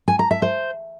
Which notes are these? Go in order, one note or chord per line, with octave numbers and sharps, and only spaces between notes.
G#5
A#5
E5
C5